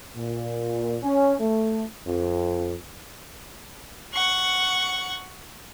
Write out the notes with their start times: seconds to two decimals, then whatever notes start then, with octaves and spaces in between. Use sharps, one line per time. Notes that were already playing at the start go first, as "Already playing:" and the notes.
0.15 A#2
1.03 C#4
1.39 A3
2.06 F2
4.14 F#5 C#6